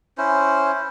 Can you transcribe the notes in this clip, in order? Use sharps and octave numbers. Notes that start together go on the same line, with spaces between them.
C#4 E4 C5